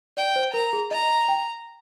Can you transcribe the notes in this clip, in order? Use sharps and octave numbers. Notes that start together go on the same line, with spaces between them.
D5 G5
C5
A#4 A#5
G#4
D#5 A#5
G5